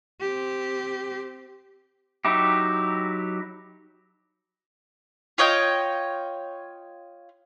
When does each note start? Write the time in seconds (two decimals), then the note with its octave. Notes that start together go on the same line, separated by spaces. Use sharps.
0.21 C4 G4
2.25 F#3 D#4 E4 G4
5.38 F4 C#5 D#5 G5